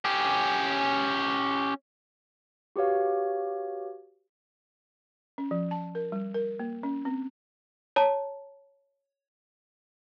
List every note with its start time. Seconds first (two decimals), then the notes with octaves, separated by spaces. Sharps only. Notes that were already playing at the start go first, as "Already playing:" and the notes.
0.05 C#4 G4
2.76 F#4 G4 B4 C#5 F5
5.38 C#4
5.51 F3
5.71 A5
5.95 A#4
6.12 G3
6.34 A#4
6.59 A#3
6.83 C#4
7.05 C4
7.96 C#5 A5 A#5